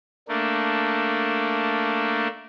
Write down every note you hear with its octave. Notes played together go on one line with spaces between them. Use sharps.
A3 A#3 D4